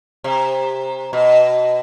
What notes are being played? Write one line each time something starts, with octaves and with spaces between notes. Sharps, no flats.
C3
B2